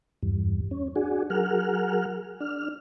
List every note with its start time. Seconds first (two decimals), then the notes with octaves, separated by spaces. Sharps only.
0.23 E2 G2
0.71 C#4
0.96 D4 F#4 G#4
1.30 F#3 G#4 A#4 F#5 F6
2.40 D4 F6